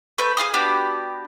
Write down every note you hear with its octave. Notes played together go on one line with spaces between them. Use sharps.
A3 B4 G6
G#4 F5 G#5 D#6
B3 D4 F#4 G4